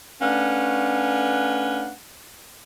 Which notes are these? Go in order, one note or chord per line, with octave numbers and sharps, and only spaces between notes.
A3 C#4 D4 B4 F5 F#5